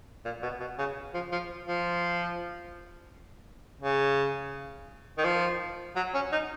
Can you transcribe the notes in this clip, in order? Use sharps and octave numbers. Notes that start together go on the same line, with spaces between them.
A#2
B2
B2
C#3
F3
F3
F3
C#3
D#3
F3
F#3
C#4
D#4